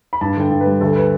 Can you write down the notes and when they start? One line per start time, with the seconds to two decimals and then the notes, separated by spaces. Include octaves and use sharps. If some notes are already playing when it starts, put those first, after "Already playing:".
0.13 B5
0.21 G2 A5
0.36 D3 G5
0.50 G2
0.61 B4
0.66 G3
0.81 D2 A4
0.96 B4